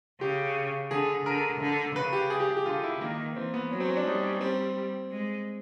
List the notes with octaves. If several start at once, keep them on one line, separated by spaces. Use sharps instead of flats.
C#3 G4
D3 G#4
D3 A#4
D3
C#3 B4
G4
G#4
G4
G#4
G4
D3 F4
E4
D#3 A#3
E3 C4
B3
F#3 C#4
C4
C#4
D4
G3 D#4
C#4
C4
G#3